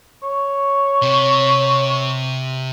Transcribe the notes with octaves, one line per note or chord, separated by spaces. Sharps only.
C#5
C3